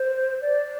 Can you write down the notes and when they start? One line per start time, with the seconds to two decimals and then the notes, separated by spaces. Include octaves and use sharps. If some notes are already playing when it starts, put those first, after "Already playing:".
Already playing: C5
0.42 D5